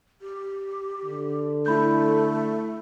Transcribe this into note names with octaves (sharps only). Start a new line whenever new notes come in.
G4
D3
A3 E4 B5 G6